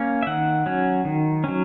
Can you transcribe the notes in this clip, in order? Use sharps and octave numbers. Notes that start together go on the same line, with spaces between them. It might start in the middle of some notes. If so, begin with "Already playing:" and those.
Already playing: A#3 C#4
E5
D#3 F#5
F#3 C#4
D#3
F#3 C#4